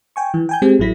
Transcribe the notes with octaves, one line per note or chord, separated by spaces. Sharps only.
G5 G#5 C#6
E3
G5 G#5 G6
G#3 C4 G4 G#4 G#5
A1 F#3 E4 A#6 B6